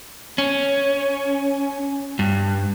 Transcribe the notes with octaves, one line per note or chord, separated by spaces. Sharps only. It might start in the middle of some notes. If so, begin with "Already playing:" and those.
C#4
G2